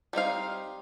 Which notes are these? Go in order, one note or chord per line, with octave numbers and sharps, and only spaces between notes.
G3 C4 D#4 F5